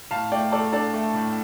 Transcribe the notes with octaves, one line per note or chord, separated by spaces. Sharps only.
A2 F5 A5
A3 D5 G5
A3 A4 D5
D4 A4 D5
A3
A2